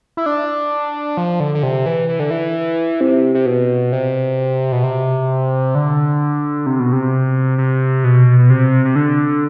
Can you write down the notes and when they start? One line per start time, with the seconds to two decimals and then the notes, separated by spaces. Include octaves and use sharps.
0.17 E4
0.26 D4
1.17 F3
1.40 D3
1.55 D3
1.63 C3
1.86 E3
2.09 E3
2.20 D3
2.31 E3
3.01 C3
3.34 C3
3.46 B2
3.92 C3
4.72 B2
4.83 C3
5.75 D3
6.66 C3
6.80 B2
6.93 C3
7.58 C3
8.04 B2
8.39 B2
8.50 C3
8.85 C3
8.96 D3